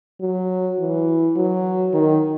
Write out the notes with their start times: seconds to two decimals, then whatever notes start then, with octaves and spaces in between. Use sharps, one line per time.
0.21 F#3
0.79 E3
1.36 F#3
1.94 D#3